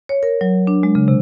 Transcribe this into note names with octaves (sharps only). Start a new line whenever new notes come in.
C#5
A#4
F#3
D4
G#3
C#3
C3